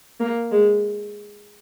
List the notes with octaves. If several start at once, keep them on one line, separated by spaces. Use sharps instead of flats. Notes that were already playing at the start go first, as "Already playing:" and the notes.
A#3
G#3